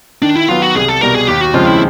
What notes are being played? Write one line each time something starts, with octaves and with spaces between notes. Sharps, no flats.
D#3 D4
E4
F#3 B3 F4
F#4
C2 G#4
A4
B2 G3 A#4
G#4
D#2 G4
F#4
C#3 F3 G#3 C4 F4
E4